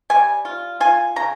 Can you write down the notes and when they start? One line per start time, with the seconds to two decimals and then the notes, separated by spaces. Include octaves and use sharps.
0.10 G3 G#5
0.45 F4
0.80 F4 G#5
1.16 C#3 A#5